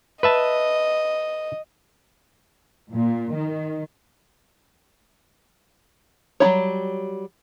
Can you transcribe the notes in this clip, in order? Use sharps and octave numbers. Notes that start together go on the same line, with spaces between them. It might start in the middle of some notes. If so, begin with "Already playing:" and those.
B4 D#5 E5 A5
A#2
D#3
F#3 G3 E4 C#5